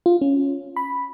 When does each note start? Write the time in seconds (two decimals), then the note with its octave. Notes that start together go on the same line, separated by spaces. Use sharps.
0.06 F4
0.22 C#4
0.77 B5